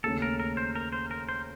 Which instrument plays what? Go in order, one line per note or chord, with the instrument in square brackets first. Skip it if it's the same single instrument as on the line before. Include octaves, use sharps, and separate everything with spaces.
[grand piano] D#2 C#3 A3 C#4 [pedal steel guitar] A4
[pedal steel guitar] A#4
A#4
C5
A#4
C5
A#4
C5